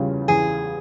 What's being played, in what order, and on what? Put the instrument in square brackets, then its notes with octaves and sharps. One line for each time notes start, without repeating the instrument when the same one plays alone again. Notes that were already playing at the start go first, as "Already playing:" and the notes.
Already playing: [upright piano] E2 C#3 G3 C#4 F4
[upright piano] E2 [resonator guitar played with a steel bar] G#4